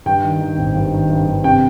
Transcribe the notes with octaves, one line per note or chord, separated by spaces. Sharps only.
G2 G5
D#3
D#3
G#1
G2
D#3
G2
G2
C3 G5